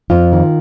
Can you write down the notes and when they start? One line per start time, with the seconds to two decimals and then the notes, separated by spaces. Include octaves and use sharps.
0.10 F2 F4
0.32 D#3